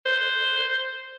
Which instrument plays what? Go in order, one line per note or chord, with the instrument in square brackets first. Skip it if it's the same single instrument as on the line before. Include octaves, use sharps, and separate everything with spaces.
[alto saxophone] C5